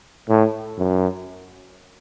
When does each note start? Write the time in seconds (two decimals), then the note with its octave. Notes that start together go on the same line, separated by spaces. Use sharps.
0.30 A2
0.78 F#2